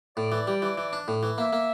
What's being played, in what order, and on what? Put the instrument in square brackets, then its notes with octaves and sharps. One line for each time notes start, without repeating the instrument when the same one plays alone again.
[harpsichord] A2 [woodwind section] D5
[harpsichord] E3
G3
E3
E3
D4
A2
E3
[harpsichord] A#3 [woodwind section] E5
[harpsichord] A#3